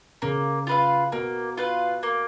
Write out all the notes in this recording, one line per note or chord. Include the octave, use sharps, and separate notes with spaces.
C#3 A#3
F4 B4 F5
B2 A#3
F4 B4 F5
A#3